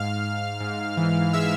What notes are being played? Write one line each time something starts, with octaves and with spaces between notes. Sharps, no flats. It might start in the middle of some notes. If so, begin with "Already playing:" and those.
Already playing: G#2 F5 F6
G#2
G#2
E3
G#3 E5 E6